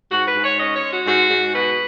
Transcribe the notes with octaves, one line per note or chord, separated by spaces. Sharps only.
G#2 F#4
B4
G#2
C#5
C#4 D#5
C#5
G#3
F#4
G#2 F#4
G#2
B2 B4